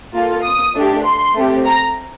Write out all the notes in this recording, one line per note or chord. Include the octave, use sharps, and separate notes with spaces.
A#3 F4 A4
D#6
A3 D4 G4
C6
A3 C4 G4
A#5